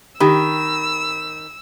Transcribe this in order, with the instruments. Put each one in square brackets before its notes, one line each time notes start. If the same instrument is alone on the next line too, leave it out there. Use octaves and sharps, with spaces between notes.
[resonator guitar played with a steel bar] D#3 [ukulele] G4 [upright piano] B5 [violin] E6